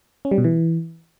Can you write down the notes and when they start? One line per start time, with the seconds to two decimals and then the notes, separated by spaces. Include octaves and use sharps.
0.25 C#4
0.31 G3
0.38 B2
0.44 E3